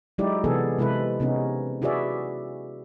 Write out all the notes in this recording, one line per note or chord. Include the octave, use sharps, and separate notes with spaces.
F#3 G#3 D#4 E4 G4 D5
C3 E3 B3 G#4 A4
C3 G#3 E4 A4 B4
C3 B3 C#4 D#4
E4 F#4 G#4 B4 D5 E5